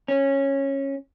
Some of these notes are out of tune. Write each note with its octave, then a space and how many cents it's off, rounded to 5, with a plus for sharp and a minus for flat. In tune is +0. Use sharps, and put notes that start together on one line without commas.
C#4 -15